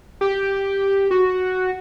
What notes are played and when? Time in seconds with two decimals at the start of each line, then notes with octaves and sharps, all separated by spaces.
0.21 G4
1.11 F#4